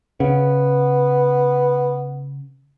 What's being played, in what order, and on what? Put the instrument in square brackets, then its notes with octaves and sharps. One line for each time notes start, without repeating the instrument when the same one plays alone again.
[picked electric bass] C#3 [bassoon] B3